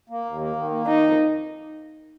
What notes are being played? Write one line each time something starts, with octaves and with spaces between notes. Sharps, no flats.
A#3
D#2
A#3
D#3
A#3
D#3 D#4
F2